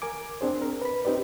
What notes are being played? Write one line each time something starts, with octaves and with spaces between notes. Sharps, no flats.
A#4 G#5 D6
C4 D4 G#4 C5
A#4
B4 B5
C4 D#4 G4 B4 D5